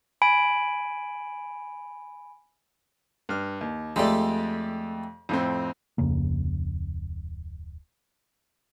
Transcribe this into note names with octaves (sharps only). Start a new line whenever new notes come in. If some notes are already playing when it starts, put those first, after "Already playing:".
G#5 B5 D7
G2 F6
D#2
F2 G#3 A3 G4 D5
F2 A2 C4
D1 F2 C#3 A#3